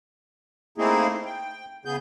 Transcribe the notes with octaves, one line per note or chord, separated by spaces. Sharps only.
A3 A#3 C4 D#4 E4 G#4
G5
C#3 B3 G#4 G6